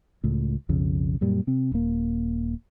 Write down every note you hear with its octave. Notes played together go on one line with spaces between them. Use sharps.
C#2 A2
B1 F2 C#3
F#2 A#2 G3
C3 C4
D#1 A#3